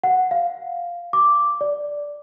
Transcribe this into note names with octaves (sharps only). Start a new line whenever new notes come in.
F#5
F5
D6
D5